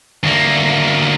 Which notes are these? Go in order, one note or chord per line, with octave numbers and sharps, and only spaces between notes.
D2 A#3